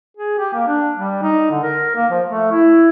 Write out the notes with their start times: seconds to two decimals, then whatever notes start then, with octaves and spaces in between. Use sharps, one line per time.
0.17 G#4
0.39 G4
0.54 A#3
0.68 D4
0.96 G3
1.22 D#4
1.51 D3
1.63 A#4
1.96 A#3
2.11 F3
2.28 A3
2.52 E4